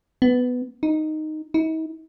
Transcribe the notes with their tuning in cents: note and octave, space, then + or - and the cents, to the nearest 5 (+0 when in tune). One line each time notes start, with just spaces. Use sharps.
B3 +10
D#4 -5
D#4 +45